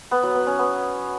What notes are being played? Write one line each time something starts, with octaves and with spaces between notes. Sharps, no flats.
B3
F#3
B3
C#4
B3